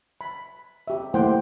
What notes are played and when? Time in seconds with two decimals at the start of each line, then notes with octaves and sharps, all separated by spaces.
0.21 B5
0.88 G4 E5
1.14 A3 A#3 E4 C5 F#5 G5